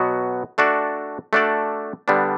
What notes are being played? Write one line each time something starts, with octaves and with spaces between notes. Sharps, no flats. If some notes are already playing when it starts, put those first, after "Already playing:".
Already playing: B2 F#3 B3 F#4
A3 D4 F#4 A4 D5
A3 D4 F#4 A4 D5
D3 G3 B3 D4